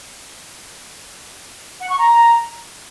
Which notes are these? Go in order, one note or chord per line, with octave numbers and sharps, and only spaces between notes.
F#5
C#6
A#5